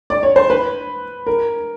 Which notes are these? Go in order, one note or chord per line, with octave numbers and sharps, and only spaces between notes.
D5
C#5
C5
B4
A#4